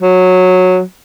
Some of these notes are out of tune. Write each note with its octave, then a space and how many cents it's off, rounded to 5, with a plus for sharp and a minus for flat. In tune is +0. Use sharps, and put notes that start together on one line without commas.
F#3 -10